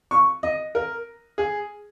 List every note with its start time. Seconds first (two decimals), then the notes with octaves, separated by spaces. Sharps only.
0.11 C#6
0.43 D#5
0.75 A#4
1.38 G#4